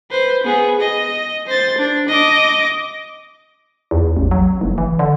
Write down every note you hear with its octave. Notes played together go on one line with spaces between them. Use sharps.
B4 C5
B3 G#4
D#5
C5 A6
D4
D#5 D6
E2
A1
F#3
F#1
E3
D3